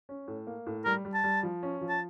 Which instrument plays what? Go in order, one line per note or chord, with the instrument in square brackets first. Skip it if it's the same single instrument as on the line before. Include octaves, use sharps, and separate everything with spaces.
[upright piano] C#4
A2
A#3
A2
[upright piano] G3 [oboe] A#4
[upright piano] G3
[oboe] A5
[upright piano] G3
F3
C#4
F3
[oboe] A5